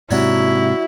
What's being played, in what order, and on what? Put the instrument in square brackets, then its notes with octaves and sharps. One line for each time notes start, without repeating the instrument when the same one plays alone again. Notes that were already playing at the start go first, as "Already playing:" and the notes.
[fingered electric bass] G#2 C3 [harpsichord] F#3 C#4 D4 [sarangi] E4